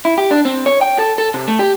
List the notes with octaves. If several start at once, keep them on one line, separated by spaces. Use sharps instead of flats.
E4
G4
D4
C4
C#5
G5
A4
A4
C3
A3
G4